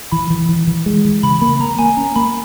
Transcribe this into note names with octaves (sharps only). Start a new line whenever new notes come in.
E3 B5
E3
E3
E3
G#3
E3
C#3 B5
A#3 B5
A#3 A#5
A#3 G#5
C#4 A#5
A#3 B5